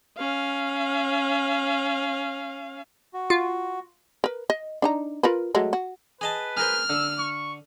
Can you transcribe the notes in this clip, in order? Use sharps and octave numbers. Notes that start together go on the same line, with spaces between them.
C#4 F5
F#4
F4
A#4 B4
D#5
D4 D#4 A#5
F4 A#4 B4
F#3 G#3 A3
F#4
G#4 B4 D#5 A5
G#4 A#4 C5 F6
D3 E6
C#6